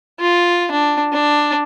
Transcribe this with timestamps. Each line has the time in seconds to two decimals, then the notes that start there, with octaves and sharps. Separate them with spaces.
0.20 F4
0.71 D4
1.13 D4